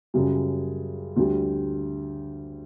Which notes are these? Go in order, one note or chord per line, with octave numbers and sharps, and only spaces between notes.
F#2 C#3 G3
D2 D3 G3